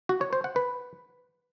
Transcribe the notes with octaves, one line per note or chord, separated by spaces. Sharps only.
F#4
C#5
C5
F#5
B4